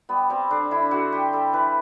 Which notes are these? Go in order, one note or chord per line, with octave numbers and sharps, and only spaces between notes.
G3 B3
G3 C4
D3 D4
D3 E4
D3 F#4
G3 G4
G3 A4
E3 B4